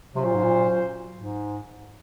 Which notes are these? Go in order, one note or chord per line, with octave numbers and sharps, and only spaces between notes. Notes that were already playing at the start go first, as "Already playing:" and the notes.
C3 F#3 C#4 F4 C5
A#2
G#2
A#2
G#2